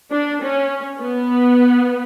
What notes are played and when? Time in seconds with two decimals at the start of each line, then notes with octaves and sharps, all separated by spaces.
0.11 D4
0.41 C#4
1.00 B3